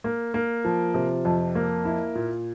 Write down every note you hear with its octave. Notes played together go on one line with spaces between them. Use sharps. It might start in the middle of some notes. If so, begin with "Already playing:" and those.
A#3
A#3
F3
C3
F2
A#3
E4
A#2